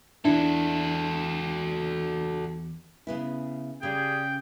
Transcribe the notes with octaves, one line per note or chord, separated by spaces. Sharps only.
E2 D4 E4 F#4 A4
C#3 B3 E4
C#3 G3 C#4 G4 G#4 G5